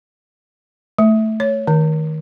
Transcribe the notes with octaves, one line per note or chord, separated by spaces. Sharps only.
A3
C#5
D#3